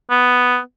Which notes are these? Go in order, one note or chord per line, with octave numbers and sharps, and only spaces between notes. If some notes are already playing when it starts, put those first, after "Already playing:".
B3